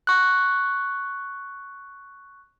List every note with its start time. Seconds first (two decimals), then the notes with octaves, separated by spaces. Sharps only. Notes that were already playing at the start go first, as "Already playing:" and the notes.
0.07 C#6 F#6